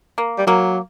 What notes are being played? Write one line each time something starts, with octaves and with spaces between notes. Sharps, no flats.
A#3
G3
F#3 A#3